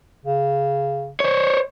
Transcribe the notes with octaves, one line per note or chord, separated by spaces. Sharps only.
C#3
C5 C#5